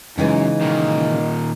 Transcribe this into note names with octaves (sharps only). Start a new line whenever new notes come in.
F#2 C#3 E3 G#3 D#4
A#2 D#3